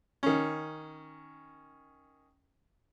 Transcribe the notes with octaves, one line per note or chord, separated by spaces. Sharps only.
D#3 C#4